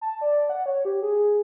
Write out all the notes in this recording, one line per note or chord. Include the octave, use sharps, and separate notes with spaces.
A5
D5
F#5
C#5
G4
G#4